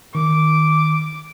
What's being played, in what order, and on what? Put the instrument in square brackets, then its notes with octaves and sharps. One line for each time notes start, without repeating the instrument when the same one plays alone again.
[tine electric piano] D#3 [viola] D6